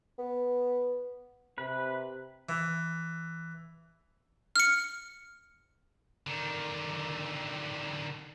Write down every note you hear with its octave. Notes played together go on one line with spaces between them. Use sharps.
B3
C3 B4
E3
F6 C#7
D3 D#3